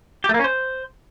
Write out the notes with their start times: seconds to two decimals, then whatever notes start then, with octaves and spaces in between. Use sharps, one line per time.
0.24 G4
0.29 A3
0.34 A#3
0.39 C#4
0.44 C5